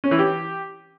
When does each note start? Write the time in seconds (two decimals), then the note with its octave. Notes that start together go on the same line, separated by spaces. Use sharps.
0.04 C#4
0.11 E3
0.19 G4